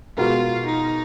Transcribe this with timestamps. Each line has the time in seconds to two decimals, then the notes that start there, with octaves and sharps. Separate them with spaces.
0.17 B2 G#3 B3 F4 F#4 A#4
0.66 D#4